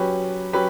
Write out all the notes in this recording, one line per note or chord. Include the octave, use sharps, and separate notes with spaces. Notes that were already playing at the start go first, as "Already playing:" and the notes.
Already playing: F#3 C#4 G4 B4
F#3 C#4 G4 B4